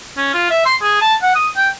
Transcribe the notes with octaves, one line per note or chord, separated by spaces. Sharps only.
C#4
F4
E5
C6
G#4
A5
F#5
D#6
G5